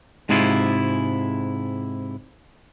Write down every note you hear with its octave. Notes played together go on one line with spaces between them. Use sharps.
G#2 C3 G#3 E4 F4